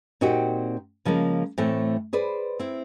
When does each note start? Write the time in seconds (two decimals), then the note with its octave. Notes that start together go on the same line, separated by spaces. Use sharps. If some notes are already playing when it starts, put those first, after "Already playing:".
0.21 A#2 C4 D#4 F#4 G4 G5
1.05 C#3 F3 G#3 A#3
1.58 A2 E3 A3 C4
2.13 G#4 B4 C5 D5
2.59 C4 E4